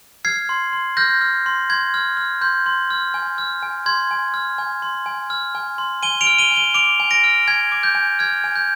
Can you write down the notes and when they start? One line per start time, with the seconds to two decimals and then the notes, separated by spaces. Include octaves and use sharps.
0.25 F6 G#6 C7
0.49 C6
0.73 C6
0.97 F6 G6 A#6
1.21 F6
1.46 C6
1.70 C6 G#6
1.94 F6
2.17 F6
2.41 C6 G6
2.66 C6
2.90 F6
3.14 G#5
3.38 F6
3.62 G#5
3.86 C6 G#6
4.11 G#5
4.34 F6
4.58 G#5
4.82 C6
5.06 G#5
5.30 F6
5.55 G#5
5.78 C6
6.03 G#5 D#7 G7
6.21 D7 F7
6.27 F6
6.39 D#7 G7
6.51 G#5
6.56 D#7 G7
6.74 D6 D7 F7
7.00 G#5
7.11 A#6 D7
7.24 F6
7.48 G#5 G#6
7.72 D6
7.83 G6
7.95 G#5
8.19 F6 G#6
8.44 G#5
8.56 G6